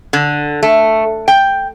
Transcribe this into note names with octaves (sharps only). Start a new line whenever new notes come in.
D3
A3
G5